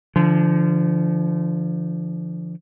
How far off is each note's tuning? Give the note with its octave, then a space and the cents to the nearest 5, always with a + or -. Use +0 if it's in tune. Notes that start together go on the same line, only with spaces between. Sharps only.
D3 +0 F3 -30